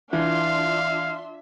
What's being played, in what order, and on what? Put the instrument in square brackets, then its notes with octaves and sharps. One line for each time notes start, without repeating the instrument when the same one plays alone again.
[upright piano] E3 [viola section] D4 F4 C6 [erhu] E5 [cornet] F5